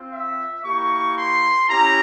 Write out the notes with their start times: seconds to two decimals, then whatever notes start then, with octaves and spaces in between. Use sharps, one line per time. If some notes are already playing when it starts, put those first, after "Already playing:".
Already playing: C4 F4
0.11 E5
0.63 A#3 E4 G4 C#6
1.16 C6
1.69 C#4 E4 G4 A#5